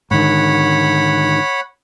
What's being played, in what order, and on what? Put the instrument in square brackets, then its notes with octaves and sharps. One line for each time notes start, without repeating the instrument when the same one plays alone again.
[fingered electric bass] G#2 D3 D#3 [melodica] C#5 F#5 B5